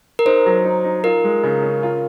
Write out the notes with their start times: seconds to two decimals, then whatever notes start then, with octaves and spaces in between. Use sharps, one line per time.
0.19 A#4
0.26 D#4 C5
0.46 F#3
0.65 D#4
0.84 D#4
1.04 F4 A#4
1.24 G#3
1.44 C#3
1.63 C#4
1.83 F4